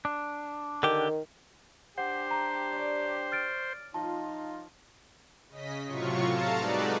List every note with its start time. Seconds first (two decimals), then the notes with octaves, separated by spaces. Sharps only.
0.05 D4
0.83 D3 D#3 G4
1.98 D4 G4 C5 F#5
2.31 A#5
2.72 C#5 D5
3.32 F6 A6 D7
3.94 F3 D#4 F4 A5
5.49 C#3 D#5 B6
5.87 A2 C3 F#3 F4 C#6
6.26 A4 F5 A5 A#5
6.57 G3 G#3 D#4 F#4 B4 D5